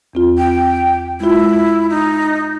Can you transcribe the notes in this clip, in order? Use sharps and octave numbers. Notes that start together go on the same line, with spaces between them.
E2 C4 F4
G5
G#3 E4 F4
D#4